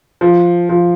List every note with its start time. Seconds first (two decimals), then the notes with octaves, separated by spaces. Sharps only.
0.21 F3
0.69 F3